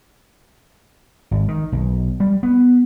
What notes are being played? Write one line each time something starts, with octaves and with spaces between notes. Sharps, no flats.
G#1
D#3
B1
G3
B3